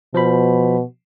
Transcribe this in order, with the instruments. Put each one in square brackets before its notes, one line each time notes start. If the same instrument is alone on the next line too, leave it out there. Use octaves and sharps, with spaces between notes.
[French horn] B2 [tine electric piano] F3 C5 B5